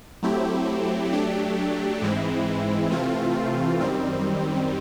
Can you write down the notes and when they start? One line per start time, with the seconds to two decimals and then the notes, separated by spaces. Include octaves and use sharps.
0.23 F#3 A3 C4 E4 G4
1.13 F#3 A3 D4 G4
2.02 G#2 E3 G#3 C4 E4
2.91 C3 E3 A3 C4 F4
3.80 F#2 D#3 G3 C4